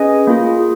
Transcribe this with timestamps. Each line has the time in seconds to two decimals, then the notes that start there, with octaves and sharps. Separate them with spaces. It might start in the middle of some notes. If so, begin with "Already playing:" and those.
Already playing: C#4 G#4 B4 D#5 G#5
0.27 A#3 F4 G#4